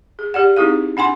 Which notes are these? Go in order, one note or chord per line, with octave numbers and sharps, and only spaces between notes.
G#4
G4 D5 F#5
C4 D#4 E4 G#4 F5
D4 F#5 G#5 C6